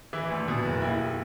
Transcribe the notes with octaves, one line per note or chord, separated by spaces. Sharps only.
E3 E4
D2
B2
F#1
D#2 E4